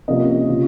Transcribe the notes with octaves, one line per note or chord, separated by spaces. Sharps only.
C3 F3 A#3 C#4 D#5
C#3 F3